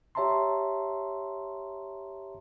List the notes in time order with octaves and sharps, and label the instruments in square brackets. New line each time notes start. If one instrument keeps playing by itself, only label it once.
[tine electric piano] G4 C#5 E5 A5 A#5 C6